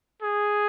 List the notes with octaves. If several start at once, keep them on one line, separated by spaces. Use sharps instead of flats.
G#4